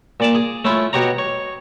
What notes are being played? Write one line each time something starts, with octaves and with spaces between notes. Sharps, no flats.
A#2 D5 A5
G#4
A3 C#4 E4 F4
B2 F#4 G4 C#5 A#5
C#5